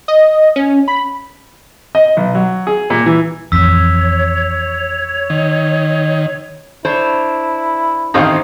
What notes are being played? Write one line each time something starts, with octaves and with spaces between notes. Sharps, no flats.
D#5
C#4
B5
D#5
B1
F#3
G#4
A#2
E3
A1 F2 C#5 E6 B6
D#3
D4 E4 C5 C#5
A1 D#3 C4 D#4 C5 F5